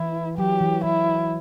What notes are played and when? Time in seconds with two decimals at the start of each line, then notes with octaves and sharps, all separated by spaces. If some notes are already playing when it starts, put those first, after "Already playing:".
Already playing: E3 E4
0.38 F#3 G4
0.61 E3
0.84 E3 E4